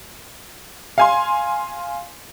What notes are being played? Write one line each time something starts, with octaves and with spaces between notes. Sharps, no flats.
F5 G#5 C6